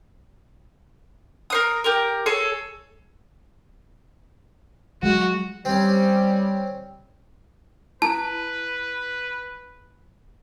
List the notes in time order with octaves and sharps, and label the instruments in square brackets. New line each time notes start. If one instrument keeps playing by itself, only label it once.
[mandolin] A#4 C5 D#6
G4 A#4
G#4 A4 C#5
[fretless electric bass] F#3 G#3 [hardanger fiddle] F#4
[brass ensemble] G3 [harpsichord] C4 C#4
[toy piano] E4 [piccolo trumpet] B4 [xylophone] A5